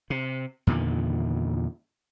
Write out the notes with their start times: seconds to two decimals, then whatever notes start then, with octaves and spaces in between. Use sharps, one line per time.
0.10 C3
0.67 E2 A#2 D3 D#3